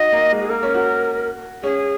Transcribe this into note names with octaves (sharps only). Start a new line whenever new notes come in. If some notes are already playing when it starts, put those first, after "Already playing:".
Already playing: D#4 F#4 D#5
A#3
G#3
G#4
A#3 A#4
C#4
F#4
C#4 G#4